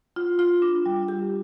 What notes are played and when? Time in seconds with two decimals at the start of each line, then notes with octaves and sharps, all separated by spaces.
0.16 F4
0.39 F4
0.62 D4
0.86 G3
1.08 G4